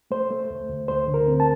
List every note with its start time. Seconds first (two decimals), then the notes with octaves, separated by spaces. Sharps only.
0.11 A3 C5
0.31 A3
0.50 D2
0.69 D2
0.88 A3 C5
1.07 D3
1.14 A#4
1.28 C4
1.40 A5